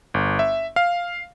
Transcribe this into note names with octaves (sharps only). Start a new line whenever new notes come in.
G1
E5
F5